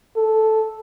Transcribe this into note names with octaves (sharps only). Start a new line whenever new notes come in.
A4